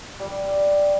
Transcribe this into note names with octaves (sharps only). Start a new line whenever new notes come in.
G3